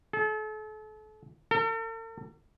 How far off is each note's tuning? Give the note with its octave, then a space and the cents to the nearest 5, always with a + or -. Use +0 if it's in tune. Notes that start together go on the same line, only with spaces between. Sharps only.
A4 -40
A4 +45